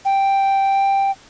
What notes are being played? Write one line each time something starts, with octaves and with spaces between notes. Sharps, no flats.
G5